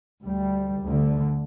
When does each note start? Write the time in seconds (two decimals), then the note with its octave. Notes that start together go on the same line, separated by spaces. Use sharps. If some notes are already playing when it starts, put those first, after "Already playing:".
0.22 D2 G3
0.82 D2 D3